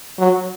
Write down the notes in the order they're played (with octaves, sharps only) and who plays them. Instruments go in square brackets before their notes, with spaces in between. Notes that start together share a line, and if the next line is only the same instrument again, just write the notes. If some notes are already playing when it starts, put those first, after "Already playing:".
[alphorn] F#3